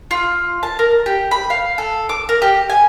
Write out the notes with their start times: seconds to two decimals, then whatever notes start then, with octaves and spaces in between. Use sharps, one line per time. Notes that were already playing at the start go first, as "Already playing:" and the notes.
0.11 F4
0.63 A5
0.79 A#4
1.06 G4
1.31 B5
1.50 F5
1.78 A4
2.09 D6
2.29 A#4
2.42 G4
2.70 G#5